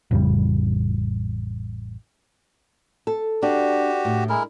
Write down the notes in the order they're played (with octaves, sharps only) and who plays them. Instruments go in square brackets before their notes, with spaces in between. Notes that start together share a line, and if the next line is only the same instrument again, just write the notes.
[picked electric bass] A1 F2 C#3 G3
[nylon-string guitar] A4
[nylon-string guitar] D4 [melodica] F#4 G4
[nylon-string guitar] A2
[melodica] G#3 E4 A#4